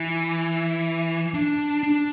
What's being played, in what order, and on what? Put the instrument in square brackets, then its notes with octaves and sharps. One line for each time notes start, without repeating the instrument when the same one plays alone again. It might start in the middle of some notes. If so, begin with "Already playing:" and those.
Already playing: [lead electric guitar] E3
D4
D4